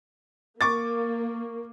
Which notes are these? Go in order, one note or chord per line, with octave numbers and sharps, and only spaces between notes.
A#3 C#6 D6 A6